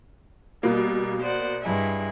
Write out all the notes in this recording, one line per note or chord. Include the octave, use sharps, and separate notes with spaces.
B2 G3 A#3
C5 D5 F#5
G2 G#3 E4